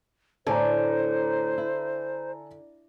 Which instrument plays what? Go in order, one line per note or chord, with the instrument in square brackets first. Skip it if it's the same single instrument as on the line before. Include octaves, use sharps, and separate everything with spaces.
[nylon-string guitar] A2 [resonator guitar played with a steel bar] D3 [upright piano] A4 G#5 A#5 [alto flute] C5
[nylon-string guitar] E4